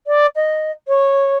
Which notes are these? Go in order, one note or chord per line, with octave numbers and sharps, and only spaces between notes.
D5
D#5
C#5